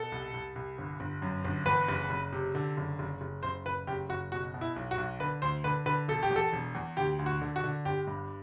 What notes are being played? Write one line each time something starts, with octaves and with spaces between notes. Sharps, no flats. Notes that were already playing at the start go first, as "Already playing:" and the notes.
Already playing: B2 A4
C2
C2
C2
G1
G1
F#2
G1
E2 B4
F#1
F#1
C3
D3
F#1
F#1
F#1
F#1 C5
F#1 B4
F#1 G4
F#1 F#4
B2 F#4
B2
E4
B1
F#4
B1
D3 B4
D2 C5
D3 B4
D3 B4
E1 A4
G4
E2
A4
E1
E2
D2 G4
D2
F#4
D3
F#4
D3
G1 G4
G2